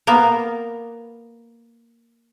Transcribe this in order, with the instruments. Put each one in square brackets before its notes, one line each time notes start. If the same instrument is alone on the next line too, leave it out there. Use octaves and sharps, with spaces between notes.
[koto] A#3 B3 A#4